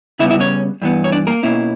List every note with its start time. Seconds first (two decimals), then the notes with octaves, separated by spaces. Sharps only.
0.19 C#3 G3 B3 E4 E5
0.30 E4 E5
0.40 C#4 C#5
0.82 G2 E3 B3
1.04 C#5
1.12 D4 D5
1.27 A#3 A#4
1.43 B2 A#3 C#4 E4